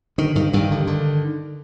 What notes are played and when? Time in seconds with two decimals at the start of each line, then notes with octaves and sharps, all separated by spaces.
0.18 D3 D#3
0.35 G2 D#3
0.53 G2 D#3
0.71 D3
0.87 D3